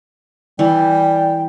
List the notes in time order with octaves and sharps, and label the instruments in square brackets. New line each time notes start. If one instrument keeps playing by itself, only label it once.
[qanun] E3 [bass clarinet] G3 [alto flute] G5